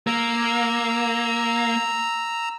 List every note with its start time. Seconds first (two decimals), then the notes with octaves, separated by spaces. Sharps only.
0.07 A#3 A#5 E6